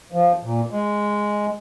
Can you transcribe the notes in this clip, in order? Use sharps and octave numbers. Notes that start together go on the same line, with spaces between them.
F3
A#2
G#3